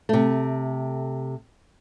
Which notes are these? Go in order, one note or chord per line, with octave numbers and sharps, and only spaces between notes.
C3 A3